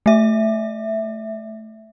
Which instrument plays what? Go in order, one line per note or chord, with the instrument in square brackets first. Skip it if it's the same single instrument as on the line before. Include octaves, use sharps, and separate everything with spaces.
[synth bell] A3 E5